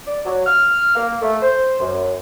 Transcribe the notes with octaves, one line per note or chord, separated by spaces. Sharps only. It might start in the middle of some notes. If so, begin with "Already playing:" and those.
D5
F#3
F6
A#3
A3
C5
F#2